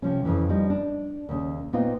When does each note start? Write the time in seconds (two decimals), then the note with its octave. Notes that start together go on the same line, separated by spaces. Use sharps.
0.02 C3 F3 C#4
0.25 F2 C#3 E3
0.49 F3 G3 D#4
0.70 D4
1.29 D#2 C#3
1.73 A#2 B3 C4 D#4 F4